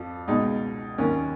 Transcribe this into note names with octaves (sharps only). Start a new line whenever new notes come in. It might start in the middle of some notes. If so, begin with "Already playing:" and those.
Already playing: F2 F3
C#2 B2 D#4
D#2 D#3 C#4